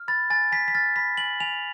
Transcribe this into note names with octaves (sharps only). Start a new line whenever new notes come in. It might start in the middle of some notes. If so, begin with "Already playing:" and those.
Already playing: F6
B5 A6
G#5 A6
G#5 B6
B6
F6 A6
B5 B6
G#5 F#7
G#5 F7